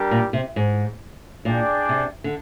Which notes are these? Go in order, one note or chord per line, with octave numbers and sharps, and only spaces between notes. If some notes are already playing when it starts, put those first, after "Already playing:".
Already playing: G3 D4 G4 A#4
A#2
C3
G#2
A#2 D4 G#4 D5 G5
C3
D3